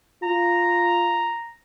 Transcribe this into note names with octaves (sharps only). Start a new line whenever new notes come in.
F4 A#5